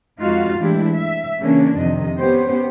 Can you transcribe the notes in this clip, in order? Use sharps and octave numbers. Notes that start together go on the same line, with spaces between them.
F2 G#3 D#4 F4 F#4 F5
A2 E3 G#3 D4 E4 G4
E5
C#3 E3 A#3 C#4 D4
F2 C3 D#3 F3 D#5
B3 C#4 G4 C5